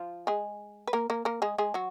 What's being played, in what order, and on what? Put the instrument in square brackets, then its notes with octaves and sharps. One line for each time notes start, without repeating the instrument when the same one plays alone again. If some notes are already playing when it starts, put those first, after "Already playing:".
Already playing: [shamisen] F3 F4
G#3 G#4
B4
A#3 A#4
A#3 A#4
A#3 A#4
G#3 G#4
G#3 G#4
F#3 F#4